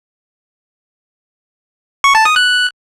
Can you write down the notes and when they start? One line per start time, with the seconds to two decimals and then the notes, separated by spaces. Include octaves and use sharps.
2.04 C#6
2.15 A5
2.25 D#6
2.36 F#6